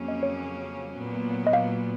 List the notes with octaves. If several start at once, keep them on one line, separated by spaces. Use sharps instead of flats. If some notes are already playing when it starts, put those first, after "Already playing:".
Already playing: F2 C#3 F#3 A#3 C#4
D#5
C#5
A#2 F#3 B3
D#5
F5